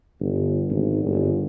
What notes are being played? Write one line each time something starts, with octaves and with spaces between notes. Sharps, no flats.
G1
G#1
G1